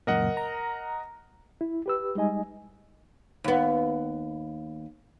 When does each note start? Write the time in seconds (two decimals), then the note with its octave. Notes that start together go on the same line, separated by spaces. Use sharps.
0.07 C#2 F#2 A#2 A#4 D#5 F#5
0.37 A#5
1.61 E4
1.86 G4 B4 E6
2.15 G3 G#3 D#4 D#5 G#5
3.44 D#2 B3